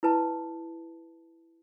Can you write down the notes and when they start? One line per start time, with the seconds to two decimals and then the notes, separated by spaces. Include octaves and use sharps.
0.03 E4 B4 A5